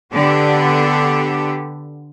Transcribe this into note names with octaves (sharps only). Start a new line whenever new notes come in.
D3 B3 D4 G4 A4 D5